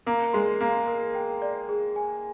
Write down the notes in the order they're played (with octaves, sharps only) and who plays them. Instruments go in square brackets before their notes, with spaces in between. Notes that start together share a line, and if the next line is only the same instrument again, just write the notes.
[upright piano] A#3 [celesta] A#4
[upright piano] G#3 [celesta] C6
[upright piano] A#3 [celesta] F5
[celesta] A#4
G5
D5
G#4
G#5